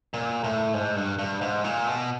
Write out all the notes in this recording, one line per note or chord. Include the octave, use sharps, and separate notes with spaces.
A#2
A2
G#2
G2
G2
G#2
A#2
B2